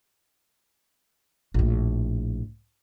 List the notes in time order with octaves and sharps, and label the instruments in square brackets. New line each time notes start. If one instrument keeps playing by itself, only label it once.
[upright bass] A#1 A2